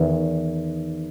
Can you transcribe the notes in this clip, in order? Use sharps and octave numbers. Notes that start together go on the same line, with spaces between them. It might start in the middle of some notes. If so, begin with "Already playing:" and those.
Already playing: E2 D#3